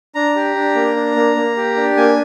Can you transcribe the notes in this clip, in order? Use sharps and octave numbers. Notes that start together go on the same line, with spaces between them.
D4 A#5
G4
D4
A#3
D4
A#3
A#3
G4
D4
A#3 G#5